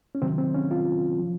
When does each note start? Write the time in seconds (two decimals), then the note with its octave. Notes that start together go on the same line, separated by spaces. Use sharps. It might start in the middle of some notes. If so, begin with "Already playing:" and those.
0.15 C#4
0.22 C3 D#3 F#3 C4
0.38 C4
0.54 C#4
0.71 F4
1.20 F3